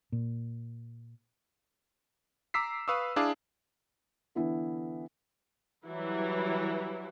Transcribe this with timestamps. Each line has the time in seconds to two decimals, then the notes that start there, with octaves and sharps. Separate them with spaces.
0.12 A#2
2.54 A#5 D6 E6 B6 C7
2.88 B4 F5 C#6 D#6 E6
3.16 D4 E4 G#4 F5 A5 D6
4.35 D3 E3 B3 E4
5.84 E3 F#3 G3 E4